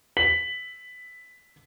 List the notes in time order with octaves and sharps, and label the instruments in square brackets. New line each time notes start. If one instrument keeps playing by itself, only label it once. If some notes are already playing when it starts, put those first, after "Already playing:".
[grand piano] B6 F#7